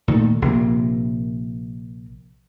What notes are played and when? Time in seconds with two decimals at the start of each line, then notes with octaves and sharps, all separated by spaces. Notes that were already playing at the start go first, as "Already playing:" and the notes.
0.08 A#2 D#3 F#3 A3
0.42 A#1 C3 A#3